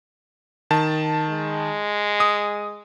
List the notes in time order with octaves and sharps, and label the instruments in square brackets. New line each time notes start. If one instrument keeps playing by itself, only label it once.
[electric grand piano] D#3 A5
[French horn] G#3
[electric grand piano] D#6